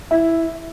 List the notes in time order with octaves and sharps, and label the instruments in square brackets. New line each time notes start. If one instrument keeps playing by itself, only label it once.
[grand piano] E4